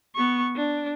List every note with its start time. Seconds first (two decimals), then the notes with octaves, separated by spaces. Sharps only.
0.15 B3 C#6
0.56 D4